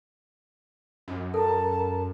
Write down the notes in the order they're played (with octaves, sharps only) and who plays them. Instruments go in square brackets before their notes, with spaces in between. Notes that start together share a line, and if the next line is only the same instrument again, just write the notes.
[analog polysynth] F#2
[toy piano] A4 [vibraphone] A#4 A#5 [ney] A5